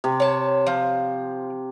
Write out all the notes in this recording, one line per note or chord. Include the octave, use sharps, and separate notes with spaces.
C3
C#5 A5
F3